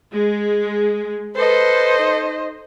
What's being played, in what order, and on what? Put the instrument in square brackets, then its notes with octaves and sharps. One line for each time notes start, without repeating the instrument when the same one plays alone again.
[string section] G#3
[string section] A4 [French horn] B4 [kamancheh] C5 D#5
[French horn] D#4